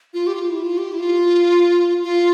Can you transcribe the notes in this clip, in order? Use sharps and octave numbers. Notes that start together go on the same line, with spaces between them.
F4
G4
F4
E4
F4
G4
E4
F4
F4